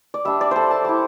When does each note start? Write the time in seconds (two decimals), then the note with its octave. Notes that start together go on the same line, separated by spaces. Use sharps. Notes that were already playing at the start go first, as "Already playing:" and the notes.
0.14 D5
0.25 G3 D4 E5
0.41 D5
0.51 A4 C5
0.71 A5
0.85 G3 E4 D6